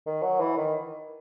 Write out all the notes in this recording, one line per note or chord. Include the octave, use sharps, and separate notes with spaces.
D#3
F#3
E3
D#3